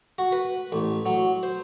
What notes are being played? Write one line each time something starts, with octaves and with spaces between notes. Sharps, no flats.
F#4
B4
A1
F#3
C5